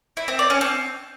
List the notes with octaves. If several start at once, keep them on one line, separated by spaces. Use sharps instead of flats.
E4
C4
D5
C#4
C4